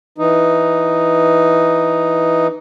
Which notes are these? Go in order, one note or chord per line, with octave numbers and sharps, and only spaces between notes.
E3 D#4